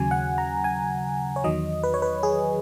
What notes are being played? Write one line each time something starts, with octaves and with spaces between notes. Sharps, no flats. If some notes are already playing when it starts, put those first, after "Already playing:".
Already playing: D#2 C#3 F#3 G#5
F#5
A#5
G#5
C#5
E2 D#3 F#3 D#5
B4
C#5
B4
G#4